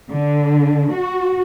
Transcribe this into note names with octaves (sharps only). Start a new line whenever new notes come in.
D3
F#4